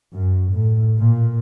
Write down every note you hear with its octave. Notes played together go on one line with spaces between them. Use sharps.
F#2
A2
A#2